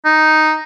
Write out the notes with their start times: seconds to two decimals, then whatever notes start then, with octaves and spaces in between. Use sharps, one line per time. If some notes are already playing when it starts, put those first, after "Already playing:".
0.05 D#4